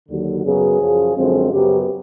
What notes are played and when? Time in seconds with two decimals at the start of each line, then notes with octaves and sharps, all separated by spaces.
0.09 D#2 D3 F#3
0.44 F#2 C#3 F#3 B3 G#4
0.80 F#2 C#3 F3
1.16 F#2 D3 F3 G#3 C4
1.52 F#2 C#3 F#3 B3 G4